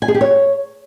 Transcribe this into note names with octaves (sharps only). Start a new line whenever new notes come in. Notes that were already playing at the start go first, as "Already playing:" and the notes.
G#5
G#4
G4
C#5